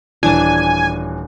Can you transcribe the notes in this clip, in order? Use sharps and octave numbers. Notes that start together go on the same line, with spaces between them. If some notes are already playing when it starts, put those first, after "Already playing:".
D#1 E3 D4 G#5 A5